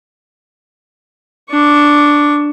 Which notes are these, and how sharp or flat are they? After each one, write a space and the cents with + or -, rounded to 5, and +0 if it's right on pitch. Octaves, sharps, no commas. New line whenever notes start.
D4 +0 C#6 +20